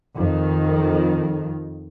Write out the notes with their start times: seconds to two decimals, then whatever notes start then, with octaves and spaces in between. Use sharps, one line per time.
0.17 F2 D#3